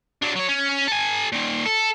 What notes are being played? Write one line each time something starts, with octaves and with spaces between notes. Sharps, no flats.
F#3 D4
F#3 C#5
C#4
A4 G#5
A#2 D#3
A4